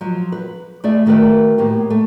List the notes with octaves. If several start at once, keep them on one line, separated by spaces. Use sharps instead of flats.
F3 F#3
B4
A3 G#4 D5 E5
D#3 A3 F#4 A#4 B4
A2 A#3 B3 G4
A3